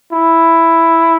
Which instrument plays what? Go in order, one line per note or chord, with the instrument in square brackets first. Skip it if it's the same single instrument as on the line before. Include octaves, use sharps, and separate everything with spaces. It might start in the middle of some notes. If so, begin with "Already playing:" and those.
[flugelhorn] E4